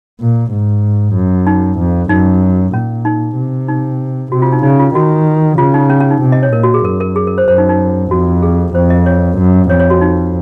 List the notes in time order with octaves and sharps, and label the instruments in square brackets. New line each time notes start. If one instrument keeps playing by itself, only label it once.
[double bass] A#2
G#2
F#2
[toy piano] D#4
[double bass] F2
[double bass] F#2 [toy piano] D#4
[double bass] A#2 [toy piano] C#4
[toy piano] D#4
[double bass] C3
[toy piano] D#4
[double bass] C3 [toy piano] F#4
[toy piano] F4
D#4
[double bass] C#3 [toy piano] D#4
[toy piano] F4
[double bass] D#3 [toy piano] F#4
[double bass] C#3 [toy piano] F4
[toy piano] D#4
C#4
C#4
D#4
[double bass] C3
[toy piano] D#5
C#5
[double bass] A#2 [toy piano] A#4
[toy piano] F#4
G#4
[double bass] F#2 [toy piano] A#4
[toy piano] A#4
G#4
A#4
C5
[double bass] F#2 [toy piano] C5
[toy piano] D#4
D#4
[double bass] F2 [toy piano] F#4
[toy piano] G#4
[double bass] F2 [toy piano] C5
[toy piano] D#5
C#5
[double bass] F#2
[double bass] F2 [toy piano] C#5
[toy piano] C#5
F#4
D#4